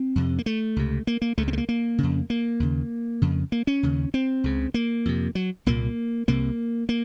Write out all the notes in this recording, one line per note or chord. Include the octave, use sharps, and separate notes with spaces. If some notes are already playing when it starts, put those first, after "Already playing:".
Already playing: C4
F2 C3
A#3
A3
C#2 C3
A#3
A#3
C#2 C#3 A3
C4
A3
A#3
A#3
F2 C#3
A#3
D#2 C#3
F2 C#3
A#3
C#4
D#2 C#3
C4
C#2 C#3
A#3
F2 C3
F#3
C2 A#2 A#3
C2 C3 A#3
A#3